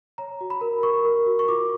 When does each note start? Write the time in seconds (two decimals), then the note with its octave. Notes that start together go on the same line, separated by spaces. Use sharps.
0.18 C#5 A#5
0.41 F#4
0.50 B5
0.61 A#4
0.83 A#4 C#6
1.05 A#4
1.26 F#4
1.39 C#6
1.48 F4 D6